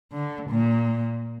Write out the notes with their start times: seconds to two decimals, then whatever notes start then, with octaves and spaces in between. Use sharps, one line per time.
0.12 D3
0.50 A#2